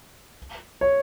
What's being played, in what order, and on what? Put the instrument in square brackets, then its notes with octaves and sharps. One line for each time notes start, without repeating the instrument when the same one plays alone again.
[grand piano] C#5